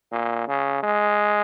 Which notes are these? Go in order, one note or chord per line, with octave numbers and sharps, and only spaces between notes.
A#2
C#3
G#3